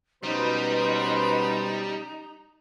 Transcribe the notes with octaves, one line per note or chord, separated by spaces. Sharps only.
B2 G3 B3 C#4 D#4 B4 C5 A#5